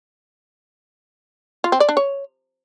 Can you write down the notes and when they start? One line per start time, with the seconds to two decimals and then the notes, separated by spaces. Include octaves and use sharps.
1.64 F4
1.72 C4
1.80 D5
1.89 D4
1.97 C#5